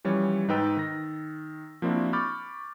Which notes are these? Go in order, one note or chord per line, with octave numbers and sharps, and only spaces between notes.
E3 F3 G3 C#4 C#5
G#2 D#4 B4 G5 E6 A6
D#3 A#6
F3 A#3 C4 D4 E4 F#4
B5 C#6 D6 F6 G6 A6